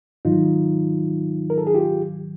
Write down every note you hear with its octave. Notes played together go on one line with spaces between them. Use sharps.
G#2 D#3 F#3 D#4 F4
A#4
A4
G#4
F4 G4